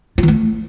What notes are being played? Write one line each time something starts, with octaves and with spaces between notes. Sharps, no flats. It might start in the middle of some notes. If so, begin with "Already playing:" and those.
F4
E3
A3